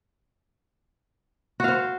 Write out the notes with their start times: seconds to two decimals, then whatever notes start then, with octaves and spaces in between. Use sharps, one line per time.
1.60 F#4
1.64 F5
1.68 C5